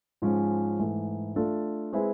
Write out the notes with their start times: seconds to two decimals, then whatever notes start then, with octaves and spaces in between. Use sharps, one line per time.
0.22 G#2 F3 G#3 C#4
0.79 G#2 E3 A3
1.36 A3 D4 F4 A4
1.93 G#3 C4 E4 G#4 B4